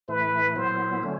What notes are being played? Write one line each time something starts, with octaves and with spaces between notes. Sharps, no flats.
A2 E3 A3 B4
A#2 F#3 B3 E4 C5
D3 F#3 A3 C#4